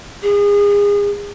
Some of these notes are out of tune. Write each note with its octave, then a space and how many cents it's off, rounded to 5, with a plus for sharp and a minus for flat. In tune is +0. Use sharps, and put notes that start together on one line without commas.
G#4 -30